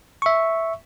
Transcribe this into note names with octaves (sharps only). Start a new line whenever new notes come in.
E5 C#6